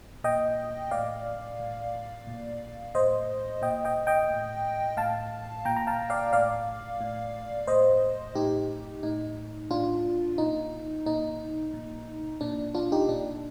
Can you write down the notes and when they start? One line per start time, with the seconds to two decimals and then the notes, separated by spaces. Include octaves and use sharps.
0.24 A#2 D#5 G5
0.91 A2 D5 F5
1.59 A2
2.27 A#2
2.94 A2 C5 D#5
3.62 A#2 D#5 G5
3.85 D#5 G5
4.07 D#5 G5
4.30 A2
4.97 A2 F5 A5
5.65 A#2 G5 A#5
5.77 A#5
5.87 F5 A5
6.10 D5 F5
6.33 A2 D5 F5
7.01 A2
7.67 A2 C5 D#5
8.35 A2 D#4 G4
9.03 A2 D#4
9.70 A2 D4 F4
10.38 A#2 D#4
11.06 A#2 D#4
11.74 A#2
12.41 A#2 D4
12.74 D4 F4
12.92 D#4 G4
13.08 A#2 D4